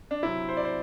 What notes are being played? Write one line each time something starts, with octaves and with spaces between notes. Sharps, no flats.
D4
C3 F#3 C4 E4
C5
D5
C5